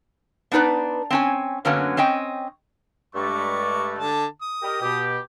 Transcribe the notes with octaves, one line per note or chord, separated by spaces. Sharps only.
B3 D4 D#4 B4 D5
C4 C#4 G#5
F#2 D3 F#3 A#3 B3 C#4
C4 C#4 D#5 G5
G2 G#3 A3 C#6 D6
D3 A5
D#6
G4 A#4 D#5
B2 G4